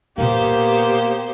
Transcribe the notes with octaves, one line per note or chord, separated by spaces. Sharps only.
A#2 A#3 B3 F4 G4 C5